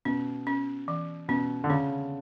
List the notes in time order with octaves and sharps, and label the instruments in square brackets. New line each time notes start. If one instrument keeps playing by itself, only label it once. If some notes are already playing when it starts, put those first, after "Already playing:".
[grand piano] B2 [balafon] C#4
[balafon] C#4
E3
[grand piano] B2 [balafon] C#4
[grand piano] D3
[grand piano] C#3 [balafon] C#4